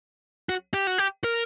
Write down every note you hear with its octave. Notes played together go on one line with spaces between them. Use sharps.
F#4
G4
F#4
G4
A#4